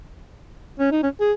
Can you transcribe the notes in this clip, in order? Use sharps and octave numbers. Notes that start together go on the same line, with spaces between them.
C#4
D#4
C#4
G#4